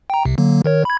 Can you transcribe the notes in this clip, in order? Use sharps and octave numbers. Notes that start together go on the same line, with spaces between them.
G5 A#5
C2 C3
D3 F#3 A#3
D#3 A#4 C#5
B5 G#6